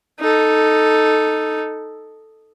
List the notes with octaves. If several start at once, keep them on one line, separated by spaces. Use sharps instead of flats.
D#4 A4